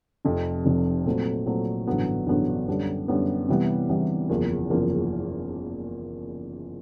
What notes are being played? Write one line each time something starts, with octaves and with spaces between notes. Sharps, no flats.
F1 F2 C3
F1 F2 C3
A#2 F#3 A3 C4
A#2 F#3 A3 C4
A1 G2 D3 F#3 B3
A1 G2 D3 F#3 B3
F#2 D3 G3 B3 D4
F#2 D3 G3 B3 D4
C3 E3 G3 B3
C3 E3 G3 B3
F#1 E2 C#3 F3 A#3
F#1 E2 C#3 F3 A#3